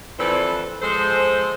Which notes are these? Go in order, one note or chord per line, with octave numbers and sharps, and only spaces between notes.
F2 E3 A4 B4 C5 D5
F3 G#3 A4 C5